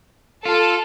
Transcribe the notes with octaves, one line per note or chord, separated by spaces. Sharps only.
F4 A4